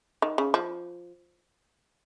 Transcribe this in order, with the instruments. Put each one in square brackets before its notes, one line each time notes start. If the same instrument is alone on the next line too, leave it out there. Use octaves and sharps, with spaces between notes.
[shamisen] D#3
C#3
F3